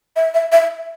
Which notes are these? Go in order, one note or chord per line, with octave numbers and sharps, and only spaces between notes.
E5
E5
E5